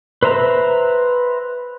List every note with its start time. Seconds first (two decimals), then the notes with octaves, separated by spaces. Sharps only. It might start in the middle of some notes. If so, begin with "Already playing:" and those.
0.23 B4 C5 E5 A#5